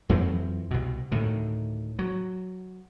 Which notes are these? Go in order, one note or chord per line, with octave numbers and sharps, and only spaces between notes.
F2 E3 F#3 C4
C2 B2
D2 A2 D#3
F#3